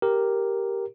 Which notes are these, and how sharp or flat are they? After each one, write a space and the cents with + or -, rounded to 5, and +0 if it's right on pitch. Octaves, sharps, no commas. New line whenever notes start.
G4 +0 A#4 +0